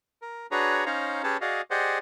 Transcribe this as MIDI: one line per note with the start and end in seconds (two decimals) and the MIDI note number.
0.22 0.47 70
0.51 0.85 62
0.51 0.85 66
0.51 0.85 68
0.51 0.85 71
0.51 0.85 73
0.51 0.85 82
0.86 1.22 61
0.86 1.22 63
0.86 1.22 72
0.86 1.22 73
0.86 1.22 77
0.86 1.22 82
1.24 1.37 61
1.24 1.37 67
1.24 1.37 68
1.24 1.37 71
1.24 1.37 73
1.24 1.37 81
1.41 1.61 66
1.41 1.61 68
1.41 1.61 74
1.41 1.61 75
1.41 1.61 77
1.71 1.98 67
1.71 1.98 68
1.71 1.98 72
1.71 1.98 74
1.71 1.98 75
1.71 1.98 78